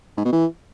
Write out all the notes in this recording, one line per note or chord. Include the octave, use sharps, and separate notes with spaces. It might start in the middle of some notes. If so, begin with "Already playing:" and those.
G#2
B2
E3